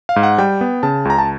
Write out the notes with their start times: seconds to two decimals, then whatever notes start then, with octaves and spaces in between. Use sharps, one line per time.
0.09 F5
0.16 G#2
0.23 F#5
0.38 G3 G5
0.61 B3
0.83 C#3 A5
1.05 C#2 A#5
1.18 A5